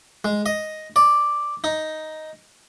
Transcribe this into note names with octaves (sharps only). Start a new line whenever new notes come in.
G#3
D#5
D5
D#4